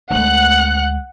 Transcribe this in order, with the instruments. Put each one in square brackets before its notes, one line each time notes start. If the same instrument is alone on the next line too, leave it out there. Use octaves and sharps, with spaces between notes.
[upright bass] D2 G#3 [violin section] F#5 F#6